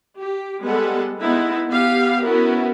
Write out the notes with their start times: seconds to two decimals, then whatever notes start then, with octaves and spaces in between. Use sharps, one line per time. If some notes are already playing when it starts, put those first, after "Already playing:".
0.16 G4
0.63 G3 G#3 B3 A4 F#5
1.19 G#3 B3 D#4 E4
1.67 B3 G4 F5
2.23 B3 C#4 E4 F#4 A#4